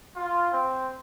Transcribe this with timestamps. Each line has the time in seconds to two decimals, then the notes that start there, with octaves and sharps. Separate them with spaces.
0.16 F4
0.52 C4